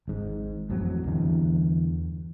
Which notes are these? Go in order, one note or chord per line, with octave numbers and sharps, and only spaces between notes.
G#1 G#2
A1 F2 F#3 C4
E2 G2 D3 E3